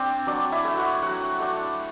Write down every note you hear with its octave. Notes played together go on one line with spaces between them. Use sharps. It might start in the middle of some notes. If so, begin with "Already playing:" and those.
Already playing: C4 D4 C5 D5
F#3 D4 D5
E4 E5
A3 E4
F#4 F#5
F#3 F#4 F#5
A3 D4